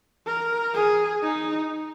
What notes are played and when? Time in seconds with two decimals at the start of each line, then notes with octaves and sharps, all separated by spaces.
0.27 A#4
0.74 G#4
1.23 D#4